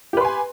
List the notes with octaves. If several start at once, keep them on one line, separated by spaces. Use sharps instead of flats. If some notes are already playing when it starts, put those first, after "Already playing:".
G4 B4 G#5 C6